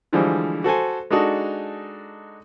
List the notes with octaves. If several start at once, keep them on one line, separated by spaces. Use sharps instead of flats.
D3 E3 F3 G3 G#3
F#4 A4 C5 G#5
G#3 D4 D#4 F#4 A4